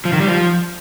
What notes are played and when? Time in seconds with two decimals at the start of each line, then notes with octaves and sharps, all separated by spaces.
0.05 F3
0.13 D#3
0.20 G3
0.28 F3